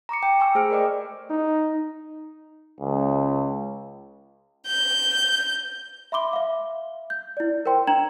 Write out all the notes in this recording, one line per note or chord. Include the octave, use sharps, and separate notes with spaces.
A#5 C#6 D6 C#7
G5
G#5 C#6 E6
A3 G#4 C5 F6 D7
A#4 C5 D5 D#5 G5 D6
D#4
C#2
G6
E5 B5 C6 D6 G7
E5 F5
G6
E4 D5
A#4 C5 G5 C6
D4 G5 A#5 G#6 E7 F#7